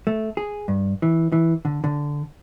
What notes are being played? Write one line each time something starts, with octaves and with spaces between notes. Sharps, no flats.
A3
G#4
G2
E3
E3
D3
D3